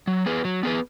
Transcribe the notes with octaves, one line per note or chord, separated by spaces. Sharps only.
F#3
B3 G#4 B4
F#3
B3 G#4 B4